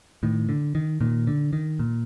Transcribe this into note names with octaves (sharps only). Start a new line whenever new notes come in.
A2 D#3
D3
D#3
A#2 D#3
D3
D#3
A#2